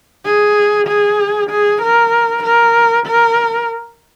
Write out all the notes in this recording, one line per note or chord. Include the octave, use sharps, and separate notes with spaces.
G#4
G#4
G#4
A#4
A#4
A#4